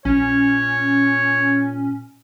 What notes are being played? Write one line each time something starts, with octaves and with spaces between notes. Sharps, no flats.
A#1 A#2 C#4 C#5